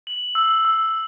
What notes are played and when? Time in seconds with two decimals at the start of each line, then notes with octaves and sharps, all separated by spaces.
0.07 F#7
0.35 E6
0.65 E6